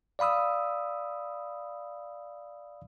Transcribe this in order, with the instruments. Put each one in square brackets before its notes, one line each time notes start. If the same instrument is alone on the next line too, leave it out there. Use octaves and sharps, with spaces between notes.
[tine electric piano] D5 F5 B5 D#6 E6